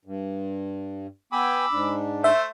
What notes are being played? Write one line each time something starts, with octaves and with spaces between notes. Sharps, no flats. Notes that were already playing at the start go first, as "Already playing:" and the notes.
G2
B3 G5 G#5 B5 D6 E6
G#2 D4
A3 C5 E5